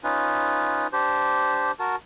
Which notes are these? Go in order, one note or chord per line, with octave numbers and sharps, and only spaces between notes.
C#4 D#4 F4 B4
D4 G4 C5
F#4 A#4 A5